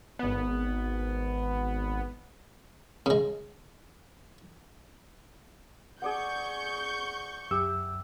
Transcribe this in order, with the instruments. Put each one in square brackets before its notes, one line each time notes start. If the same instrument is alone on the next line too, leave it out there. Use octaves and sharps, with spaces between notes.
[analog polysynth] G#1 B3
[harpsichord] C#3 G#3
[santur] G#4 D5 F#5 [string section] C#6 G6
[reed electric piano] C2 F#2 E6 [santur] G4 E5